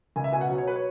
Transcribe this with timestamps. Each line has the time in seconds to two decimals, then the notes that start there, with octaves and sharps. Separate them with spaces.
0.16 C#2 G#5
0.24 E5
0.32 B2 G#5
0.41 F#5
0.50 F#3
0.58 C#5
0.67 B4
0.76 C#5